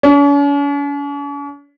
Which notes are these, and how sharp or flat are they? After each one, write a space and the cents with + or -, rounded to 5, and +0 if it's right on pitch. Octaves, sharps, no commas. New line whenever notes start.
C#4 +45